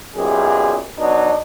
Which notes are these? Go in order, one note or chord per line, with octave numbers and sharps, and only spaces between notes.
B1 F#2 A#2 G4 G#4
B2 F#3 D4 D#4